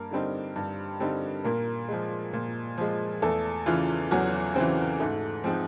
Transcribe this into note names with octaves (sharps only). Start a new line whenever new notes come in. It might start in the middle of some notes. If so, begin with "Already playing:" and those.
Already playing: G2 A#3 A#4
D3 G3 C4 D#4
G2
D3 G3 C4 D#4
A#2 A#3 A#4
F3 G#3
A#2
F3 G#3
E2 A3 A4
C#3 E3 F4
E2 F#3 F#4
C#3 E3 C4 C5
G#2 A3 A4
F3 G#3 C4 D#4